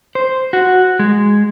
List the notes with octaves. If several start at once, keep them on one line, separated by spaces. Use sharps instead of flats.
C5
F#4
G#3